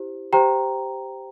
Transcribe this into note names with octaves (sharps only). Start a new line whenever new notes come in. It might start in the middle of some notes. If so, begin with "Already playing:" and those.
Already playing: E4 G4 C5
G4 C5 G5 A#5